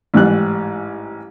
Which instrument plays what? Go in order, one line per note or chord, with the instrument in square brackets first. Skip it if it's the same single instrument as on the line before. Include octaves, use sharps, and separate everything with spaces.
[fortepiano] A1 G#2 G3 F#6